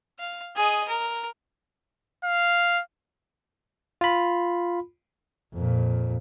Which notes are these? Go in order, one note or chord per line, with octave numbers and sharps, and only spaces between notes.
F5
G#4 D#5
A#4
F5
F4 B5
F2 A#2